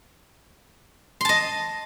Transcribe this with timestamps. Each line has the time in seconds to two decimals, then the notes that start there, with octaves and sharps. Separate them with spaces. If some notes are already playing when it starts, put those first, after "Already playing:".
1.21 C6
1.25 A5
1.29 D#5